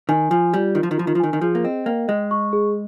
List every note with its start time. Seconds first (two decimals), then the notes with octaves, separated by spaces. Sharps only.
0.09 D#3 G#5
0.31 F3 G#5
0.54 G3 F4
0.75 D#3 F4
0.83 F3
0.91 D#3
0.98 F3 F4
1.07 D#3
1.15 F3
1.20 D#3 G#5
1.33 D#3
1.41 F3 G#4
1.55 A#3
1.64 C4 D#5
1.86 A#3 G5
2.08 G#3 D#5
2.31 C#6
2.53 G#4